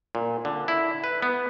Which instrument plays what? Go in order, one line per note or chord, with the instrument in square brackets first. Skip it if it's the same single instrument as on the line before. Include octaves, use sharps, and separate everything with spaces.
[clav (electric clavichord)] A#2
D3
E4
B4
B3